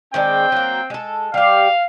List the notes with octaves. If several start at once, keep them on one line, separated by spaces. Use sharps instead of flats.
D#3 G#3 C4 D4 G5
F#3 A#3
G#3 A4
G3 G4 F5